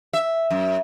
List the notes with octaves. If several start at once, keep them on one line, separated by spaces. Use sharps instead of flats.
E5
F#2